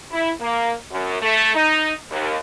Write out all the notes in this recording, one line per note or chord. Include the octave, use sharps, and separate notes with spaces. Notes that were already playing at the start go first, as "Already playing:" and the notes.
E4
A#3
F#2
A3
D#4
D#2